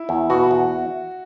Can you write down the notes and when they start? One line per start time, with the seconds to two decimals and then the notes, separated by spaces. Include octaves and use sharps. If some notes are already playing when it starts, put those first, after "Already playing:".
Already playing: E4
0.09 E2
0.30 B2 F#4
0.51 E2